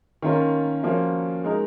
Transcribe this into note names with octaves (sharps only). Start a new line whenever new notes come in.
D#3 A#3 C#4 F4 A#4
F3 A#3 C#4 F#4 C#5
G#3 D#4 A#4